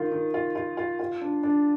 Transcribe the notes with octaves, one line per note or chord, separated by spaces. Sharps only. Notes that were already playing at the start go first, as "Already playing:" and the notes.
Already playing: D#3 F4
D#3
F4
F4
F4
F4
D4
D4